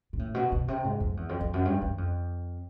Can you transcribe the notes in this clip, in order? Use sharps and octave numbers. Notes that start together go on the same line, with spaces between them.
A#2
A2
B2
B2
C3
G#2
F2
E2
F2
F2
F#2
G2
F#2
F2